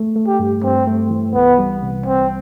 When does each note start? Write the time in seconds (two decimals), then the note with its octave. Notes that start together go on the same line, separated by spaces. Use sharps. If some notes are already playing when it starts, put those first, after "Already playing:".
Already playing: A3
0.16 A3
0.27 G4
0.39 G2
0.63 G2 C4
0.87 A3
1.10 E3
1.34 C2 B3
1.58 G3
1.82 C3
2.06 C2 C4